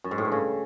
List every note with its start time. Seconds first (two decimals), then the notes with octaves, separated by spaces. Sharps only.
0.04 F#2
0.11 G#2
0.18 A2
0.25 G2
0.32 C#3